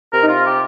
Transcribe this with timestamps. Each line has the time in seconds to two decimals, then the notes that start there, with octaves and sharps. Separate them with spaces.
0.12 C3 A#4
0.21 D#4
0.28 F4
0.44 G4